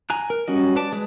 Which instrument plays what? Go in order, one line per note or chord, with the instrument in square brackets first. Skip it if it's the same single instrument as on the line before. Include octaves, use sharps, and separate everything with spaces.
[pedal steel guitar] G#5 A#5 F#6
A#4
G3 C#4 F#4 D#5
B4 D5 A5
G#3 B4